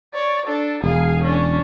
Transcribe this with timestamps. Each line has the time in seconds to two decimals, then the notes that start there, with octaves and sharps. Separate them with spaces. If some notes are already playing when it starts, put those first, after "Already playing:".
0.14 C#5 D5
0.46 D4 A4
0.84 E1 G#4 F5
1.23 C#4 D4